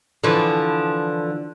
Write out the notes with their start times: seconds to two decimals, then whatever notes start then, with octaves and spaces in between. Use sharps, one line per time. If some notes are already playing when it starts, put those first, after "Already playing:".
0.24 D3 E3 F3